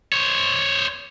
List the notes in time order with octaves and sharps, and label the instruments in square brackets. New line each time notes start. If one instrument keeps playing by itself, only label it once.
[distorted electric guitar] C5 C#5